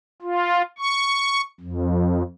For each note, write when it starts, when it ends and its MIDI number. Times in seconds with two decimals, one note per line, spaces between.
0.22 0.62 65
0.78 1.41 85
1.61 2.23 41